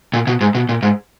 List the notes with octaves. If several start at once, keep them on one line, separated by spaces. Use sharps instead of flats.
A#2
B2
G#2
B2
A#2
G#2